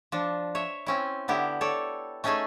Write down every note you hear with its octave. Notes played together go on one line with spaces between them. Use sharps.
F3 D4
C#5 E5
C4 C#4 E4
D3 B3 E4 G4
A4 C#5 D5
A3 C#4 D#4 G#4 A4 G#5